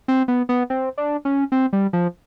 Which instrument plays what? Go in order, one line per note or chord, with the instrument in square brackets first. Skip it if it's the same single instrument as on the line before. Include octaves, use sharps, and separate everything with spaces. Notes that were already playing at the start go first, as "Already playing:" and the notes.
[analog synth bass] C4
B3
B3
C4
D4
C#4
C4
G3
F3